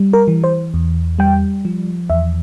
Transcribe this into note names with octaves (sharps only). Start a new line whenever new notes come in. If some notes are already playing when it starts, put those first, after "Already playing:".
Already playing: G3
A#4
E3
C5
E2
G3 G5
F3
E2 E5